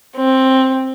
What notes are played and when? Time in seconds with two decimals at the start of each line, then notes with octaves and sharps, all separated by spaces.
0.15 C4